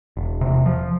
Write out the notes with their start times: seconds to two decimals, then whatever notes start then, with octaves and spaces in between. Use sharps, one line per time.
0.17 E1
0.41 C3
0.66 F3